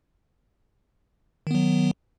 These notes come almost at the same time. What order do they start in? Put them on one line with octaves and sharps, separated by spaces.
D#3 B3 F#3